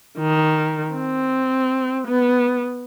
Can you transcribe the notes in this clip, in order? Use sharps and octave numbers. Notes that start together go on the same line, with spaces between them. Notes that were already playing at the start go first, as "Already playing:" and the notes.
D#3
C4
B3